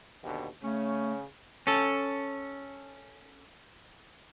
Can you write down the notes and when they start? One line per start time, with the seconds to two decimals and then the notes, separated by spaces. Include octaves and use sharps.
0.23 D#2 B2 D3
0.62 C#3 A3 C#4
1.67 C#4 A4